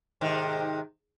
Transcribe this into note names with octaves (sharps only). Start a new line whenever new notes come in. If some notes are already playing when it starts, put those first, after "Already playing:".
G#2 C3 D#3